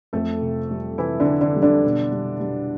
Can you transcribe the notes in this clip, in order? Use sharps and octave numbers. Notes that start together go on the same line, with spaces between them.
F2 A3 A4
C3
G3
C3 E3 E4
D3 D4
E3
D3 D4
G3
D3 D4
B2
G3
G3